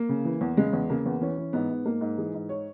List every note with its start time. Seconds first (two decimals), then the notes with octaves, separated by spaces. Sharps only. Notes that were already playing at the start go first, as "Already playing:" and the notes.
Already playing: A#3
0.09 C#3
0.25 E3
0.41 E2
0.57 C#3 G#3
0.73 E2
0.90 C#3 A#3
1.06 E2
1.21 E3 C#4
1.38 E3
1.53 G#2 B3
1.70 G#2
1.85 G#2 A#3
2.01 G#2
2.18 E3 G#4
2.34 G#2
2.49 C#5